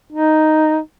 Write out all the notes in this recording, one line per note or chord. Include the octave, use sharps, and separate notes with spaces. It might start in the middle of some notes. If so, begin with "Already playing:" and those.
D#4